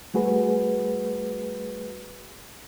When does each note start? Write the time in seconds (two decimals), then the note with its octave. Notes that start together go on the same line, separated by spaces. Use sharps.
0.14 G3 A3 F#4 G#4 B4